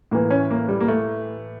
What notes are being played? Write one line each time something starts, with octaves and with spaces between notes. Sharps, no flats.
A2 E3 A#3
C#4
A#3
G3
A#3
A3